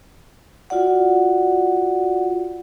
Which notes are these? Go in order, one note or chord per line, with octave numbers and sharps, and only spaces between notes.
F4 F#4 D5 F#5